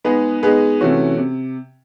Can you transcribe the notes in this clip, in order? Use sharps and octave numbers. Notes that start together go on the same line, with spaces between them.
G#3 B3 D#4 G#4 B4
G#3 B3 D#4 G#4 B4
C3 E3 A3 C#4 F#4
C3